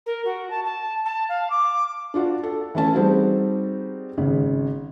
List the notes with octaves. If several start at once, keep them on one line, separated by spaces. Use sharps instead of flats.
A#4
F#4
A5
A5
A5
F5
D6
D4 F4 F#4
A4
E3 A3 C#4 A5
G3 C4 D#4 F#4 G#4
G#1 C#3